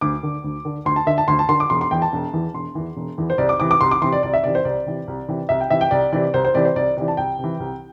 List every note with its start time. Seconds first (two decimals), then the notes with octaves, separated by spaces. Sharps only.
0.01 D2 D6
0.23 D3
0.44 D2
0.65 D3
0.85 D2 C6
0.96 A5
1.07 D3 E5
1.18 A5
1.28 D2 C6
1.39 A5
1.49 D3 C6
1.60 D6
1.70 E1 C6
1.81 C6
1.91 E2 E3 G5
2.02 A5
2.13 E1
2.33 E2 E3
2.54 E1 C6
2.75 E2 E3
2.96 E1
3.18 E2 E3
3.30 C5
3.38 C2 D5
3.49 D6
3.60 C3 E3 D6
3.71 D6
3.81 C2 C6
3.91 D6
4.01 C3 E3 C6
4.12 D5
4.23 C2 D5
4.34 E5
4.44 C3 E3 D5
4.55 C5
4.65 C2 D5
4.86 C3 E3
5.08 C2
5.28 C3 E3
5.49 C2 E5
5.60 G5
5.70 C3 E3 E5
5.81 G5
5.91 C2 D5
6.12 C3 E3 D5
6.34 C2 C5
6.45 C5
6.55 C3 E3 D5
6.65 C5
6.76 C2 D5
6.97 C3 E3 D5
7.08 A5
7.17 C2 G5
7.39 C3 E3
7.60 C2